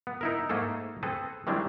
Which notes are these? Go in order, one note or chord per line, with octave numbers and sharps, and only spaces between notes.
B3
D#4 E4 A#4
G#2 A3 A#3 G#4 A4
C4 G#4 A4 B4
D#3 E3 G3 G#3 C4 D4